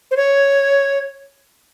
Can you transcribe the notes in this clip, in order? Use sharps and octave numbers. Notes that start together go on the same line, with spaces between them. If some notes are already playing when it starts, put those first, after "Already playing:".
C5
C#5